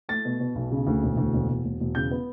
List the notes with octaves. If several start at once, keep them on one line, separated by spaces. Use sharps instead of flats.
A3 A6
B2
B2
B1
C#3
D2
E1
D2
E1
E1
E1
E1
C#3 G6
B3